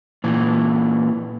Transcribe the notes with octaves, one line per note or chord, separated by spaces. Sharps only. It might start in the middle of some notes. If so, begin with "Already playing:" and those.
A#2 E3